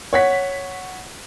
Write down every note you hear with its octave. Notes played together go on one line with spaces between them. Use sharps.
C#5 F#5 B6